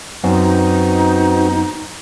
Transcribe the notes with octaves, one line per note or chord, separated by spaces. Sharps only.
F#2 B3 C4 D#4 F#4